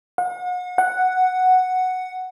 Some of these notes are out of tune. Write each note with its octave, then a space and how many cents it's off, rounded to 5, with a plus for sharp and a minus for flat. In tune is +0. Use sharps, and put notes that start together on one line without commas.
F#5 -40
F#5 +0